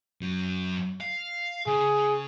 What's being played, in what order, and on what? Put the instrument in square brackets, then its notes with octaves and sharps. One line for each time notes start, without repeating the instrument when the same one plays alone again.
[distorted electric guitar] F#2 F#3
F5
[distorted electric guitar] C#3 [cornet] G#4